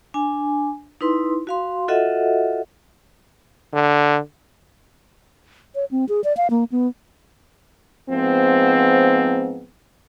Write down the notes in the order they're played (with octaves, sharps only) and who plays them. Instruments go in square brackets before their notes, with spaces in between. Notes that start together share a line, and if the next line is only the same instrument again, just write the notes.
[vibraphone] D4 G#5
D#4 E4 B4 C6
F#4 F5 C6
F4 F#4 A4 D#5 E5 F#5
[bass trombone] D3
[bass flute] C#5
C4
G#4
D5
F5
A#3
B3
[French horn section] G#2 F3 B3 C4